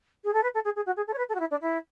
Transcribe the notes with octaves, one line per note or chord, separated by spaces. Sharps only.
G#4
A4
B4
A4
G#4
G#4
F#4
G#4
A4
C#5
B4
A4
F#4
E4
D4
E4